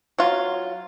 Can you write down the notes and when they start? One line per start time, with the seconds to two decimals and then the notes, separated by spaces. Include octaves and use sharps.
0.18 F#3 F4